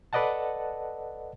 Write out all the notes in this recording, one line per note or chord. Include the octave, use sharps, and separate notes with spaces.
A4 B4 D5 D#5 F#5 A5